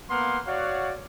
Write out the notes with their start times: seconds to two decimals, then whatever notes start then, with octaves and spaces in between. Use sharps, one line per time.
0.10 A#3 B3 B4 F5 F#5 C6
0.47 F#4 C#5 D5 F5 F#5